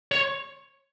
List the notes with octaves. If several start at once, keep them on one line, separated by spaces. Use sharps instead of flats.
C#5